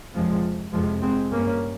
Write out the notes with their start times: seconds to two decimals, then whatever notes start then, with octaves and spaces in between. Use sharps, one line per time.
0.14 F2 C3 F3 G#3
0.73 F2 C3 F3 G#3
1.02 G#3 C4
1.31 G2 A#3 C#4